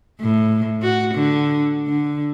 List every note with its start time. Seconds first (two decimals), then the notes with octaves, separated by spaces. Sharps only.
0.20 A2
0.82 F#4
1.14 D3
1.87 D3